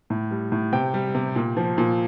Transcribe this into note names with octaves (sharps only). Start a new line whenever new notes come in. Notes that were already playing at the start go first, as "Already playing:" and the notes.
A2
G3
A2
C3 G5
G3
C3
A#2
F3
A#2